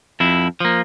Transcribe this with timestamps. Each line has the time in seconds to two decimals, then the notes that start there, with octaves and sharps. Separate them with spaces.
0.20 F2 E4
0.60 F3 A#3